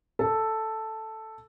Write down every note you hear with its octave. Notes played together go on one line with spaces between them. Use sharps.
A4